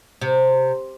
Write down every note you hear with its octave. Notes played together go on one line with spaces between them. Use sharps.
C3